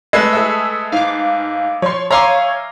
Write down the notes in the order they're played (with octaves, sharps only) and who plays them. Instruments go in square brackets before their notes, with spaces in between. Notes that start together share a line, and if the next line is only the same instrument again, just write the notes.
[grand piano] G#3 A3 B4 [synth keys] E6
[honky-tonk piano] G#4 A4 E5
[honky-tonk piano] G#2 [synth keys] F5 D6
[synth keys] F3 [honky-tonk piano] C#5 C6
[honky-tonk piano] C#5 [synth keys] E5 F5 G#5 [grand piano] A#5 C6 D6